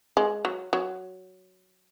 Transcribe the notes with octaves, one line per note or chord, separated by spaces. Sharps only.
G#3
F#3
F#3